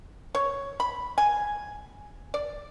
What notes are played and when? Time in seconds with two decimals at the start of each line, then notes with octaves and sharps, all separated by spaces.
0.35 C#5
0.80 B5
1.18 G#5
2.34 D5